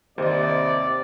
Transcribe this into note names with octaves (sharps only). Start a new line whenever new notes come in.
D#2 C3 C5 D5 D#5